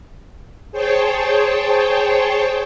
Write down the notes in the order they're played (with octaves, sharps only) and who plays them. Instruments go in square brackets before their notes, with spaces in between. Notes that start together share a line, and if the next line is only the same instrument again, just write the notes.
[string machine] G#4 C5 C#5 G5 A5